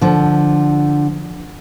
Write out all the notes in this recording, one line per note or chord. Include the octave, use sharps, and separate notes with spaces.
D3 F3